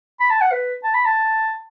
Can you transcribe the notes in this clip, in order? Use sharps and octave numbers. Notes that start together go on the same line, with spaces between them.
B5
A5
F#5
B4
A5
B5
A5